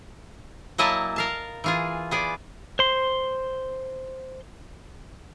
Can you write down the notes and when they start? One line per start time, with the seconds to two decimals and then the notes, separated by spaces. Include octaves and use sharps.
0.78 F#3 A#3 E4 D#5 G#5 A5
1.16 A#4 F5 A5
1.64 E3 F4 G#4
2.11 B3 G#4 D5
2.79 C5 C6